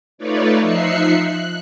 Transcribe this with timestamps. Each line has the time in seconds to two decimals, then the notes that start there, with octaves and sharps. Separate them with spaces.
0.18 A3 D#4 F4 B4 C#5 D5
0.61 F3 D#4 E5 F#6 C7 C#7
1.22 F#6